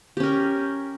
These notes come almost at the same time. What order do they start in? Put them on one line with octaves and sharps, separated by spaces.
G4 C#4 A#4